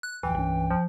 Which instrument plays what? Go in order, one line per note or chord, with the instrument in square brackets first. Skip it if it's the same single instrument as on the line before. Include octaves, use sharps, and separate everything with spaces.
[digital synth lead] F#6
[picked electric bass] D1 F2 [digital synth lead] E3 [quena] G5
[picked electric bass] C2 G2 C#4
[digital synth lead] F3